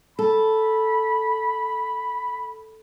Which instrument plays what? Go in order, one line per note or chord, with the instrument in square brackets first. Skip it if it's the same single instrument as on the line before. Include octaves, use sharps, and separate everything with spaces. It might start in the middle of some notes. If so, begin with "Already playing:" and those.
[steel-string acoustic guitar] A4 [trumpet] B5